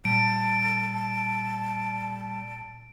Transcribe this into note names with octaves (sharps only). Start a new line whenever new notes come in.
A#2 G3 A5 D7